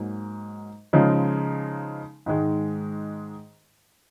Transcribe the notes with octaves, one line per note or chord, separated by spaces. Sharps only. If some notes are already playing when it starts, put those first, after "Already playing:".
Already playing: G#2 F#3 A#3
C#3 F3 G#3 D#4
G#2 D#3 G#3